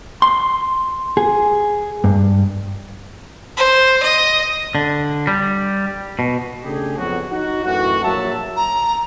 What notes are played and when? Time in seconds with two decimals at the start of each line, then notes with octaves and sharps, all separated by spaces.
0.22 C6
1.17 G#4
2.04 G2
3.57 C5
4.03 D#5
4.75 D3
5.27 G3
6.19 B2
6.64 C#3 A3 D4 G4 G#4
6.97 F2 F#3 B3 F#4
7.30 D#4 F#4
7.65 F#2 A2 E3 F#4
8.03 A#1 F#3 A#3 E5 A5
8.57 A#5